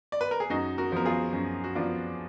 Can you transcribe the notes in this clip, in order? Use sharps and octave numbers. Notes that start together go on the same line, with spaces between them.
D5
B4
A#4
G#4
F#2 D#4 F#4
F#4 A#4
F3 B3 A#4
F4 G#4
F#2
F#4
F3 B3 D4 F4